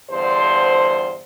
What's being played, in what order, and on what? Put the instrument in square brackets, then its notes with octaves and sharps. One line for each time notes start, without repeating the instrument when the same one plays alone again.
[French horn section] E2 G2 D3 C5